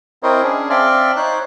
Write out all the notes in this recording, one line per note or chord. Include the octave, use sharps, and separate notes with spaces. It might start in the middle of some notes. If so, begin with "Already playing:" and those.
C4 E4 A#4 C5 C#5 D#5
C#4 D4 G#4
C4 D5 E5 F5 A5 C6
D#4 C5 C#5 F#6